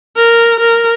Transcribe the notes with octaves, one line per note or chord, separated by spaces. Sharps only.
A#4
A#4